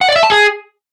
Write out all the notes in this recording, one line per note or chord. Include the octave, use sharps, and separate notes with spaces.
F#5
D5
E5
A5
G#4